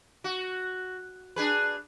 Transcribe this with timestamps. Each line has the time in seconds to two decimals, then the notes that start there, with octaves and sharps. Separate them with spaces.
0.24 F#4
1.36 D4 G#4 B4